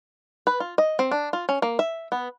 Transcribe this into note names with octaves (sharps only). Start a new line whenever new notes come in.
B4
F4
D#5
C4
D4
F4
C#4
A#3
E5
B3